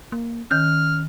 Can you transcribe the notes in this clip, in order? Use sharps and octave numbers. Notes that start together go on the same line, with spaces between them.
A#3
D#3 C#4 F6 G6